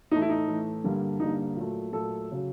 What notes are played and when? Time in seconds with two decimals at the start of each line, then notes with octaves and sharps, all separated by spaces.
0.11 A2 E3 A3 D#4
0.22 E4
0.29 D#4
0.48 A2 E3 A3
0.84 G2 D3 G3 A#3
1.20 G2 D3 G3 A#3 D#4
1.56 A#2 F#3 A3
1.92 A#2 F#3 A3 A4
2.32 C#3 F#3